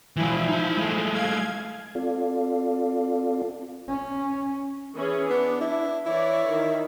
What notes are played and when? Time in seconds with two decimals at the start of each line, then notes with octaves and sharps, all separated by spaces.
0.16 E3 F3 G#3 E4
0.48 D#4 E5
0.77 G#3 A3
1.12 F5 G#6
1.70 G#6
1.95 C4 F4 A4 D5 F5
3.89 C#4
4.95 E3 C#4 G#4
5.30 B3 D4
5.61 E4
6.06 E3 E4 C#5 D5
6.49 D#3